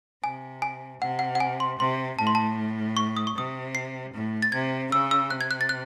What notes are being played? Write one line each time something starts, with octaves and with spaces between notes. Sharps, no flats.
C3 G#5
G#5
C3 F#5
F#5
F#5
G#5
C6
C3 C6
A2 A5
C6
A5
C#6
D#6
C#6
C3 D#6
C7
A2
A6
C3 G#6
C#3 E6
E6
C3 F#6
G#6
F#6
A6
F#6